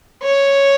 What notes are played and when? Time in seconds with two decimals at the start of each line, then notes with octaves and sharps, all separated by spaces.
0.23 C#5